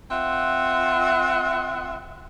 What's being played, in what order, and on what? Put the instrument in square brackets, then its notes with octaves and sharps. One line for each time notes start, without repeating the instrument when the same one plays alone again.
[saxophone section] C4 F4 E5 F#5